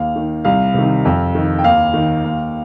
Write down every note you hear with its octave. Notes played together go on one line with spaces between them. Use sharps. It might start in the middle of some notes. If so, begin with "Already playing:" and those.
Already playing: D#2 F5
D#3
C2 F5
C3 D#3
F2
D#3
G5
D#2 F5
D#3
D#2